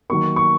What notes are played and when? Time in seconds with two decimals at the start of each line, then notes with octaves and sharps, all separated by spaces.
0.09 D#3 F#3 A#3 C#6
0.36 C#6